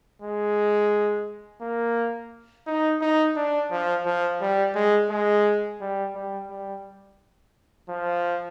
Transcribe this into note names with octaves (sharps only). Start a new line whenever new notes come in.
G#3
A#3
D#4
D#4
D4
F3
F3
G3
G#3
G#3
G3
G3
G3
F3